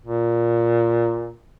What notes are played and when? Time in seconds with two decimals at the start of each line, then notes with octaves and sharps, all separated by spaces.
0.06 A#2